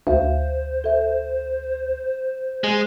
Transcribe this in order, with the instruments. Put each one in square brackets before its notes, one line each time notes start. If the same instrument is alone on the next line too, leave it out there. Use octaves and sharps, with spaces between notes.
[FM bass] D2 [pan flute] C5 [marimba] E5 F5
[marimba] A4 E5
[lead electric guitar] G#3